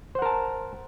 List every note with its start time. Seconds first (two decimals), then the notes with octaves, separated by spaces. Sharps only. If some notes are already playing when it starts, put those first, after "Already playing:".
0.15 C5
0.19 F#5
0.22 A#4
0.26 A5